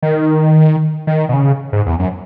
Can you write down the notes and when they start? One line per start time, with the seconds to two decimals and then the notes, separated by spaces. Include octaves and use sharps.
0.03 D#3
1.07 D#3
1.29 B2
1.34 C#3
1.72 G#2
1.86 E2
1.99 F#2